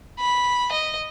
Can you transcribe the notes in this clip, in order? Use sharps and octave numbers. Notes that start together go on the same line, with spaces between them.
B5
D#5